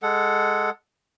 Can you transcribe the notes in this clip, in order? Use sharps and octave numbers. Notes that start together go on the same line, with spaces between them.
G#3 A4 F#5